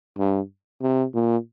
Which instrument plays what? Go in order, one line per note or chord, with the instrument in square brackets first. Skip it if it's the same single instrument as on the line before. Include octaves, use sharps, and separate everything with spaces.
[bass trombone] G2
C3
A#2